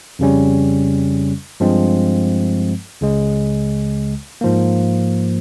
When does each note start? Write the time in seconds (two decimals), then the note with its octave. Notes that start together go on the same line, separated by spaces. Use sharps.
0.19 F2 C#3 G3 C#4
1.60 G2 F3 G#3 C4
3.01 C#2 C#3 G#3
4.41 G#2 F3 A#3